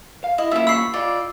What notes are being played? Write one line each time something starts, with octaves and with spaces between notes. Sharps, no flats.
F5
E4 D#5
A#3 C#4 E4 F4 E5
B5 C#6 E6 C7
F4 D5 D#5